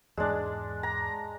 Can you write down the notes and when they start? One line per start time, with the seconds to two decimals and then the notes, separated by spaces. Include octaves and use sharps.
0.17 E2 G#2 G#3 D4
0.83 A#5